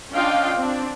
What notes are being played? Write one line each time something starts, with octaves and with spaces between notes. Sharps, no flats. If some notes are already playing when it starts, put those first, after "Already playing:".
C#4 D4 F4 D#5 F5 G5
C4 D4